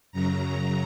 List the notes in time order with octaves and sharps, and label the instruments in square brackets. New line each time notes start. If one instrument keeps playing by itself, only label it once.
[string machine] F#2 C#3 F#3 A#5